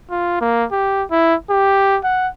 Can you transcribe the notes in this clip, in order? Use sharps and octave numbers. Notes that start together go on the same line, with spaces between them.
F4
A#3
G4
E4
G4
F#5